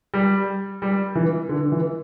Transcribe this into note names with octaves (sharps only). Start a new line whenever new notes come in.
G3
G3
E3
D3
E3